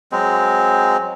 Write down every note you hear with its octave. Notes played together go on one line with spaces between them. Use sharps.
F#3 G#3 C4